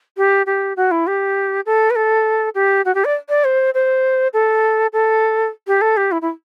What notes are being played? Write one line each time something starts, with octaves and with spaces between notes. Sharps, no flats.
G4
G4
F#4
E4
G4
A4
B4
A4
G4
F#4
G4
D5
D5
C5
C5
A4
A4
G4
A4
G4
E4
E4